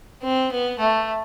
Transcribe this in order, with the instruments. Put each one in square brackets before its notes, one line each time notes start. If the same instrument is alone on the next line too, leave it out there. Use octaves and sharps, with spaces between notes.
[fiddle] C4
B3
A3